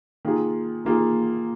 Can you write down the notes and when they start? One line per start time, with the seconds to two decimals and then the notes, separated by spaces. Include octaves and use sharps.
0.25 D#3 A#3 F4 G#4
0.85 D#3 A#3 F4 G#4